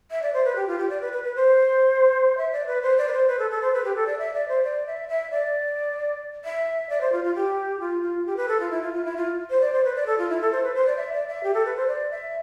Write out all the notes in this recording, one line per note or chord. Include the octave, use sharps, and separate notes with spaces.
E5
D5
C5
B4
G4
F4
G4
D5
B4
B4
B4
C5
E5
D5
B4
C5
D5
B4
C5
B4
A4
A4
C5
B4
G4
A4
D5
E5
D5
C5
D5
E5
E5
D5
E5
D5
C5
F4
F4
G4
F4
F4
G4
B4
A4
F4
E4
F4
F4
E4
F4
C5
D5
C5
B4
D5
A4
F4
E4
A4
C5
B4
C5
D5
E5
D5
E5
G4
A4
B4
C5
D5
E5